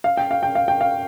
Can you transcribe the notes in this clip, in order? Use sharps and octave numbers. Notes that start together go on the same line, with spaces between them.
F5
G5
F5
G5
F5
G5
F5